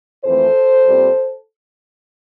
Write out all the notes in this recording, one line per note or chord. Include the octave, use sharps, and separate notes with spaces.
F2 E3 A3 C4 A4 C5
A#2 G3 C4